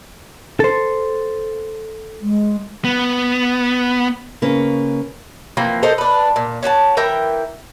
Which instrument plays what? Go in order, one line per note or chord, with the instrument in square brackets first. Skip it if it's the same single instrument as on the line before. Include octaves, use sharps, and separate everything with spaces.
[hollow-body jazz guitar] A4 C5
[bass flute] G#3
[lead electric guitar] B3
[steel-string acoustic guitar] C#3 A#3 C#4 B4
[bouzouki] E3 F3 A#3 C4
A4 A#4 C5 D#5
D4 B4
A#2
C#4 F#4 C#5 A5
E3 A#4 E5 G5